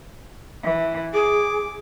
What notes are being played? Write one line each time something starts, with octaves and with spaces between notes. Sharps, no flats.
E3
G#4 D6